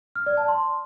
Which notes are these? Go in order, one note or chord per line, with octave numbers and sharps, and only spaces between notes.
F6
D5
A5
C6